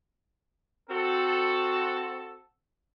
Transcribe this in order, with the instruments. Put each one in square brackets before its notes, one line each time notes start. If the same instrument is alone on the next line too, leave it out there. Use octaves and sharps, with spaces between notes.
[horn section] C4 F#4 A4